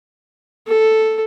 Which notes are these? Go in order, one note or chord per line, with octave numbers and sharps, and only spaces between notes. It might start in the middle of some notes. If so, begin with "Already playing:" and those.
A4